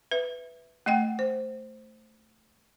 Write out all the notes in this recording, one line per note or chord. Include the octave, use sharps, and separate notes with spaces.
B4 E5
A3 D#5 F#5 G5
C5